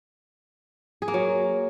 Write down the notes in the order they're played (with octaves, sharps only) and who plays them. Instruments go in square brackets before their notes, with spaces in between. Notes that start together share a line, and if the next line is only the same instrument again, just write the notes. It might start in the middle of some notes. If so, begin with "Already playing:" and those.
[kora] G#4
A#3
F#3